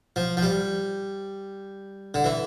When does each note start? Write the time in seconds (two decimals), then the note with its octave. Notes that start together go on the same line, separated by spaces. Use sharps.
0.16 F3
0.37 F3
0.43 G3
2.14 D3
2.24 E3